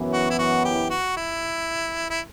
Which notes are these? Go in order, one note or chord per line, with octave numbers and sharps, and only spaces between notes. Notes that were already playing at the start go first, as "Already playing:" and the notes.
Already playing: F#2 E3 B3
F#4
E4
F#4
G4
F#4
E4
E4